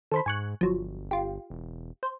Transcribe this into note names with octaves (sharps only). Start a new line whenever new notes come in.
D#3 A4 C5 B5
G#2 G#5 C#6 F#6
G1 F3 F#3
F4 G4
E1
C5